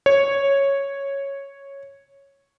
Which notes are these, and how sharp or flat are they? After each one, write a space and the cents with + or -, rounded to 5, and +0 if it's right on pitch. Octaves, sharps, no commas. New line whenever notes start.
C#5 -5